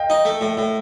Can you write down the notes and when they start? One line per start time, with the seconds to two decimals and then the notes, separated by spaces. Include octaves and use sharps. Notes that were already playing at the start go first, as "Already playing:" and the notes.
Already playing: D#5 F5 G5
0.10 D#4
0.25 A3
0.41 A2
0.57 A2